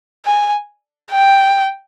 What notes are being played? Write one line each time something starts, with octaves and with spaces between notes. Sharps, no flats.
G#5
G5